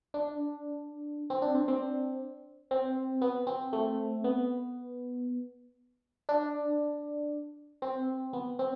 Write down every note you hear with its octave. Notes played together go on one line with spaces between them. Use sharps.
D4
C4
D4
C4
C4
C4
B3
C4
A3
B3
D4
C4
B3
C4